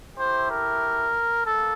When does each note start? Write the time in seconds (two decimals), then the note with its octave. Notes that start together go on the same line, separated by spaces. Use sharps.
0.17 A3 E4 G4 C5
0.49 A#4
1.45 A#3 A4